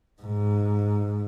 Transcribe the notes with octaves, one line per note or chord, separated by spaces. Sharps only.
G#2